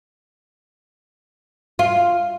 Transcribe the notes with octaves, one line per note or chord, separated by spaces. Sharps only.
F4